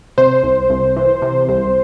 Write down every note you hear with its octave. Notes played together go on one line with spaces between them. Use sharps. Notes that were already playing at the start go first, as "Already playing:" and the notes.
C3 C5
C2
C2
E3
C3
C2